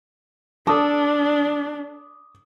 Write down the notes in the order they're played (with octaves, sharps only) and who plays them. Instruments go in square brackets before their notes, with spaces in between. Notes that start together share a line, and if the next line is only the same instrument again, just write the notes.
[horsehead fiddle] D4 [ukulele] A4 [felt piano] D6 D#6